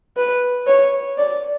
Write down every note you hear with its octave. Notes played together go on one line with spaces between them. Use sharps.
B4
C#5
D5